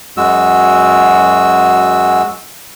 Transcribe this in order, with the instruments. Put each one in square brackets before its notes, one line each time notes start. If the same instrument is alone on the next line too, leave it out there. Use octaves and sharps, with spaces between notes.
[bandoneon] F#2 G#3 F#4 E6